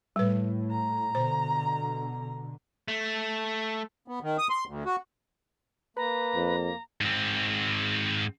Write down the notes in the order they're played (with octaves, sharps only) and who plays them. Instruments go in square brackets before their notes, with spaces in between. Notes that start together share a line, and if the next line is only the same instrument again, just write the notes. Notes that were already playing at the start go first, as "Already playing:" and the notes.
[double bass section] A2 [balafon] G3 B4
[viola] A#5
[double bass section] B2 D3 [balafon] C5
[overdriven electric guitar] A3
[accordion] B3
D#3
D#6
C6
D2
F#4
[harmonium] A#3 [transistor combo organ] B4 [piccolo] A#5
[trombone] F2
[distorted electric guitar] G#2 C4